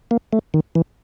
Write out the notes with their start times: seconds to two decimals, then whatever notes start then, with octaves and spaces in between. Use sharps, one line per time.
0.11 A#3
0.33 A3
0.54 D#3
0.75 E3